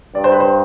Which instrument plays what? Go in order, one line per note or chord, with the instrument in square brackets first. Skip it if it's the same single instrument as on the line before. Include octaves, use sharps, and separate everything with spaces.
[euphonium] G2 [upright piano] D5
[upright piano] C5
B4
C5